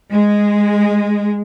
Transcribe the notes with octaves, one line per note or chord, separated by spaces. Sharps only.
G#3